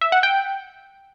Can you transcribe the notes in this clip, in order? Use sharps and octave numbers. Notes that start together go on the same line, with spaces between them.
E5
F#5
G5